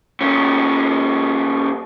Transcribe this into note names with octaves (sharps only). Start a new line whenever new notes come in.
A#2 C#4